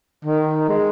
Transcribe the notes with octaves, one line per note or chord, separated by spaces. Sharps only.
D#3
G#3